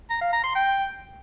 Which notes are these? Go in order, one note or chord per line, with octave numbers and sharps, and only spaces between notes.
A#5
F5
A#5
C6
G5